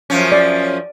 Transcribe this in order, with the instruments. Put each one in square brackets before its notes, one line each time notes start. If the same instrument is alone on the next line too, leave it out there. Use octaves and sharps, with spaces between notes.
[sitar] F#2 F3 C#4
[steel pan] D5